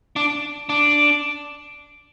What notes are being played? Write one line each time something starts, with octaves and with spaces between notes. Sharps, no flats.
D4
D4